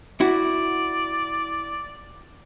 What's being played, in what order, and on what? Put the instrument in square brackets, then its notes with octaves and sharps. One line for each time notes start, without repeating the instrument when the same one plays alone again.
[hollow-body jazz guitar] E4 F#4 [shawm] D5